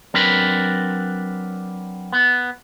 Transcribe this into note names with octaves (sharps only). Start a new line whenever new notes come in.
F#3 C4 D4 A#4 B4 B5
B3